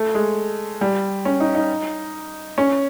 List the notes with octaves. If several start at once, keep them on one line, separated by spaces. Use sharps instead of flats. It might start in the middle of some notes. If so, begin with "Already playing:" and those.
Already playing: A3
G#3
G3
C#4
D#4
D#4
C#4